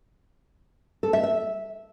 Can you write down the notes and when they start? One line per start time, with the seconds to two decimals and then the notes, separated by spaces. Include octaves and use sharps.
1.03 A4
1.13 E5
1.23 E5